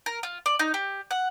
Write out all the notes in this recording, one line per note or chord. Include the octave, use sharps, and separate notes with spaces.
A#4
F4
D5
D#4
G4
F#5